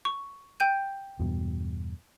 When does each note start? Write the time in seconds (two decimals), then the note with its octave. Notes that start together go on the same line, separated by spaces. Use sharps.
0.05 C#6
0.60 G5 G6 D#7
1.19 E2 G2 B2